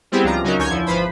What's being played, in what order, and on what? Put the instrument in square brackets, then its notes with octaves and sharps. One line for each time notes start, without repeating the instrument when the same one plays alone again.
[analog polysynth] G3 B3 C4 E4 G4 G#4
C#2 F3 D4 F4 A#5
C#3 F#3 C#4 D#4 F#4 A#4
C#2 D3 C#5 G#5 G6 G#6
E2 F3 E4
G#1 F3 B4 C5 B5